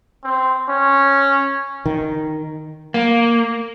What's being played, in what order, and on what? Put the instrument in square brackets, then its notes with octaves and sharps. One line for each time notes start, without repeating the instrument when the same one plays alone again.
[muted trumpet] C4
C#4
[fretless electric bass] D#3
[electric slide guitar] A#3